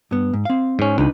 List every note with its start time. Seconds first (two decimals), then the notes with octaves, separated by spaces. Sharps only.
0.11 G2 B3
0.33 G#2
0.45 C4 F5
0.79 G#2 C#4
0.98 C#2 D4 D#4 B4